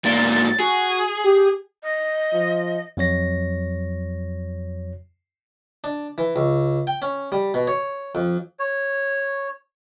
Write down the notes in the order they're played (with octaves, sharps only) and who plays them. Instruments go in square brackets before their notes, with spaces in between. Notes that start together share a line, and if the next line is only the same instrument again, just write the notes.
[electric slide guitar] G#2 A#3 D5 [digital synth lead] A6
[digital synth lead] F#4 [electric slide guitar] G#4
[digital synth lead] G4
[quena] D#5
[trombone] F3
[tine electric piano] F2 F#3 C#5 A#6
[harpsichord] D4
E3
C#2
G5
C#4
G3
B2
C#5
F2
[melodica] C#5